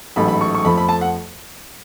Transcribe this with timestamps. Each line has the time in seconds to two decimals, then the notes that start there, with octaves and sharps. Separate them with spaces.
0.16 A1 G#2 F#3 A3 B5
0.28 B5
0.41 C#6
0.55 C#6
0.64 F2 F3 A3 B5
0.78 B5
0.89 A5
1.01 F#5